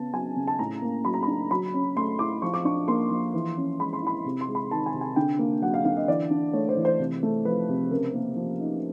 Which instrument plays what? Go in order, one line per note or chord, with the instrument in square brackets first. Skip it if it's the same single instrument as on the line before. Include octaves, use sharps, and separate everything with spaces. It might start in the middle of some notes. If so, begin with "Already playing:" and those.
Already playing: [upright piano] C#3 B3 A5
F#3 G#5
C#3
A5
A2 A#5
A#3
F#3 B5
A#5
D4 B5
F#3 B5
C#4
A3 C6
E4 D6
F3 C#6
D6
D4 C#6
A#3 C6
F3
E3
C#4
G#3 B5
C6
E4 B5
C3
C6
G#3
B5
D#3 A5
G#5
C3
G#5
D3 G5
A#3
F#3 F#5
F5
D3 F5
D#5
E3 D5
D4
A3 C#5
C5
E3
C5
C3
A3
F3 B4
C3
C#3 A#4
A#3
F3
D#4